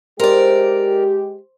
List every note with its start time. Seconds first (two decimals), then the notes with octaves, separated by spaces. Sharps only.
0.20 G#3 G4 A#4 C5 D5